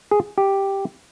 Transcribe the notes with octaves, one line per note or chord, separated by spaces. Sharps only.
G#4
G4